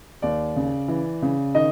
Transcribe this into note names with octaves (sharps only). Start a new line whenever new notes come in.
D#2 D5
C#3
E3
C#3
D#3 D#5